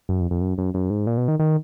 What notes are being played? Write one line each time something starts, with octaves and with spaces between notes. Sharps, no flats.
F#2
F2
F2
F#2
F#2
F#2
G#2
A#2
B2
D#3
D#3